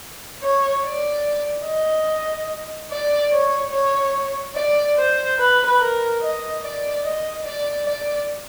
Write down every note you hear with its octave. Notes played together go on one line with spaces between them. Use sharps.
C#5
D5
D#5
D5
C#5
C#5
D5
C5
B4
A#4
D#5
D5
D#5
D5
D5